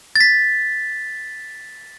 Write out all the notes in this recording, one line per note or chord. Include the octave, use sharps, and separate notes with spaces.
A6
B6